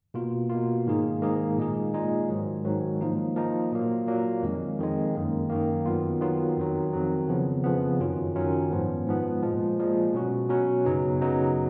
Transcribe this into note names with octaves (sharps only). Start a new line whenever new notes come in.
B2 A#3 F4
B2 A#3 F4
G#2 D#3 A#3 D#4 G#4
G#2 D#3 A#3 D#4 G#4
A#2 G#3 D#4 G#4
A#2 G#3 D#4 G#4
G#2 D#3 F#3
G#2 D#3 F#3
F3 A#3 D#4
F3 A#3 D#4
A#2 F#3 A#3
A#2 F#3 A#3
F2 D#3 G#3
F2 D#3 G#3
F#2 D#3 A#3
F#2 D#3 A#3
D#3 F#3 B3 F4
D#3 F#3 B3 F4
F2 D#3 F#3
F2 D#3 F#3
F2 C#3 F3 B3
F2 C#3 F3 B3
F#2 D#3 F#3 C#4 F4
F#2 D#3 F#3 C#4 F4
G#2 F3 B3
G#2 F3 B3
A#2 F3 G#3
A#2 F3 G#3
B2 F#3 C#4 F#4
B2 F#3 C#4 F#4
F#2 C#3 F#3 B3 D#4
F#2 C#3 F#3 B3 D#4